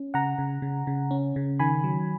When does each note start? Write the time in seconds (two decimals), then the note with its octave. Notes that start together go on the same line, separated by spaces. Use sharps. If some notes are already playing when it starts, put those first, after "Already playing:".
Already playing: C#4
0.14 C#3 F#5 A#5
0.39 C#3
0.62 C#3
0.87 C#3
1.11 C#4
1.36 C#3
1.59 D#3 G#5 B5
1.84 F#3